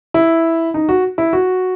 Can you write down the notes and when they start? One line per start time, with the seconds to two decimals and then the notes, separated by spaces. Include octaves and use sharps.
0.14 E4
0.74 D#4
0.89 F#4
1.18 E4
1.33 F#4